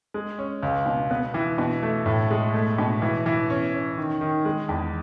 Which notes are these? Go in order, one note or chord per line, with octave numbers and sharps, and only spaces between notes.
G#3
C#4
C#2
B2
B3
E3
B2
A3
A2
G#3
A3
B2
E3
E3
C#4
C#4
D#3
D#3
G#3
E2